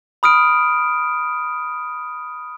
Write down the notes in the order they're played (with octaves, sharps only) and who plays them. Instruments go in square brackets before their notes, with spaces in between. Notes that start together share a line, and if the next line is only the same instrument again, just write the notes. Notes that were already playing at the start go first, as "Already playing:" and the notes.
[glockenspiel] B5 D#6 F6 D7